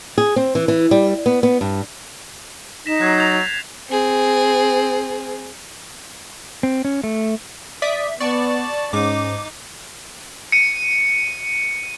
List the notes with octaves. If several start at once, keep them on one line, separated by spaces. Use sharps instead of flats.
G#4
C4
E3
E3
G3
B3
B3
G2
D#4 A#6 B6 E7
F#3 F#6 G#6 C7
G6 A6 F7
C4 G#4
C4
C#4
A3
D5 E5 D#6 B6
B3 D5 A5 C#6 D6
G#2 C#4 D#4 D6
C#7 D#7